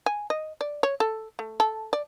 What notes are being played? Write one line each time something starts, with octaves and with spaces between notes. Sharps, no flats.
G#5
D#5
D5
C#5
A4
A3
A4
D5